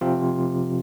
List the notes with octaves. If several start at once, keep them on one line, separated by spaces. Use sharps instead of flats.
C3 F3 C4 F4